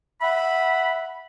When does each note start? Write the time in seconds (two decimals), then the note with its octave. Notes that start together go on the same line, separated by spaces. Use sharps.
0.22 E5 F#5 B5